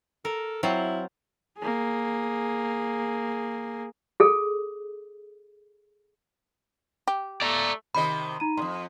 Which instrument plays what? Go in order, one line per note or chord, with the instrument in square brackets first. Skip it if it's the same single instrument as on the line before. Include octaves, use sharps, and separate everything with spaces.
[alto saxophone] A4 [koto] A#4
[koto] F#3 C4 F4 [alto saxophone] E4
[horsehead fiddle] A#3 G#4
[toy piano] G#4 A4
[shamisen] G4
[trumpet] A3 [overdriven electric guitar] D5 A#5
[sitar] C3 D#3 D#5 [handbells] B5
[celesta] D#4 A#5 D#7
[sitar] F2 A2 [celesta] C6 D#6